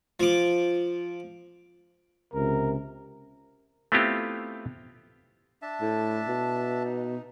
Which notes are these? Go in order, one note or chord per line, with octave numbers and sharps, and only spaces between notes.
F3 D6
C#2 C3 A#4
A3 B3 C4 E4 F4 G4
D4 E5 A5
A2
B2
D#4